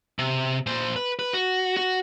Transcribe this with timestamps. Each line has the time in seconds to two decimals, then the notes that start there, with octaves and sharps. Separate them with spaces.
0.19 C3
0.66 A#2 C5
0.96 B4
1.19 B4
1.34 F#4
1.77 F#4